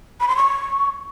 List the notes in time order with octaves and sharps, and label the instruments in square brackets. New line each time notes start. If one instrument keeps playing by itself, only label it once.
[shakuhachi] B5
C6
C#6